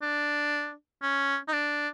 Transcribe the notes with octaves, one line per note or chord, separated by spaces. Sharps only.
D4
C#4
D#4
D4